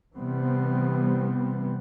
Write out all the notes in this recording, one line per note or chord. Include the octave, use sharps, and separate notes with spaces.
C3 E3 G3 B3 C4